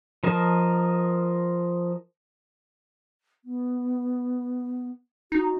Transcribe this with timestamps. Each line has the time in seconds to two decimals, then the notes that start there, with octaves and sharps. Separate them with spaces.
0.23 F3 A#4 D#5 A5
3.45 B3
5.32 D#4 F#4